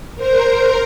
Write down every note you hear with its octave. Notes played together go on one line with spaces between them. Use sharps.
A#4 C5 A#5